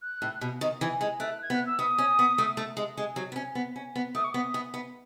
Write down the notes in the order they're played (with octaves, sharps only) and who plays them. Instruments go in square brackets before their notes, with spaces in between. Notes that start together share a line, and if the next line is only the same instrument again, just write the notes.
[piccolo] F#6
[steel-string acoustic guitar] A2
B2
D#3
E3
G#3
[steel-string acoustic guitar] A3 [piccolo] F#6
[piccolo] G#6
[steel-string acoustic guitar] B3
[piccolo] F#6
E6
[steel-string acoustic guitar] B3 [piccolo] D#6
[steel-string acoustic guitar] C#4
B3
A3
A3
G#3
G#3
F#3
B3
C#4
B3
C#4
B3
[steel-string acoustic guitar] A3 [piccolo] D#6
[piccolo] C#6
[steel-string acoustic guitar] B3 [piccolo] D#6
[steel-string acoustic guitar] B3
B3